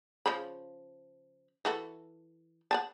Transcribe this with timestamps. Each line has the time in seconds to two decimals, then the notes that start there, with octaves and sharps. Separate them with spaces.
0.26 C#3 F3 B5
1.65 E3 F#4 A4
2.71 F#5 G#5 A5